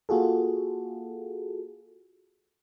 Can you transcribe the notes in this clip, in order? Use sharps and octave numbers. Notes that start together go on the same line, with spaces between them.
A#3 F4 F#4 G#4 A4